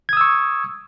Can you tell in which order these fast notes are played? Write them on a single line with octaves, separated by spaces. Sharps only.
G#6 D#6 E6 C#6